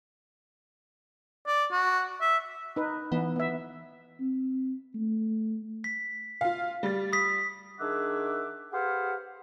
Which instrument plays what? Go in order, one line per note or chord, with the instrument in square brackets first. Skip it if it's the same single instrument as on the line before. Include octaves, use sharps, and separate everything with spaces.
[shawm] D5
F#4
E5
[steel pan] D#4 B4
[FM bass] E3 [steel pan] B3
[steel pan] B3 E5
[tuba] C4
A3
[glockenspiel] B6
[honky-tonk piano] F4 F5
G3 A6
[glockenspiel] D#6 B6
[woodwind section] D#3 D4 G#4 E5 F#5 D6
G4 G#4 B4 C5 F5 F#5